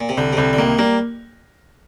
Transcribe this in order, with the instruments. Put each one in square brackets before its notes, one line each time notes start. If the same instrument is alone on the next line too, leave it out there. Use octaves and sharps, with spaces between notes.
[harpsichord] A#2
C3
[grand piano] C2 [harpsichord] D3
[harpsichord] C3
[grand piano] C2 [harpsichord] D3
[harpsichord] D3
[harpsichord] D#3 [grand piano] A#3
[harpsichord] G3 [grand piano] A#3